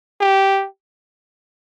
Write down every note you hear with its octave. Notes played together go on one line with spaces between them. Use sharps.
G4